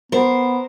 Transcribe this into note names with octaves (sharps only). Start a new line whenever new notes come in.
B3 A#4 C5